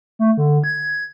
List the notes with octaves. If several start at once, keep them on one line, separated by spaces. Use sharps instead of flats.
A3
D3
G#6